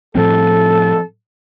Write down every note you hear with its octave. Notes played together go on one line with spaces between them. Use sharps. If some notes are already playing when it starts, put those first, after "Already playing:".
A2 F3 C4 A4